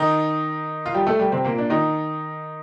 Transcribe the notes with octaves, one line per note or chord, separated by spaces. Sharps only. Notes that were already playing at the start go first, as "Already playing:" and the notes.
Already playing: D#3 D#4
F4
G3 G4
A3 A4
G3 G4
C3 C4
A#2 A#3
D4
D#3 D#4